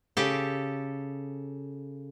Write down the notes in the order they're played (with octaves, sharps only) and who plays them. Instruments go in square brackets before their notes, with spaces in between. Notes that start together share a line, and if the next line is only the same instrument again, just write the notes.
[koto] C#3 G4 A4